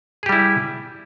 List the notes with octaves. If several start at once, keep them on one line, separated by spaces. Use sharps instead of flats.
G3 E4 G4 G#4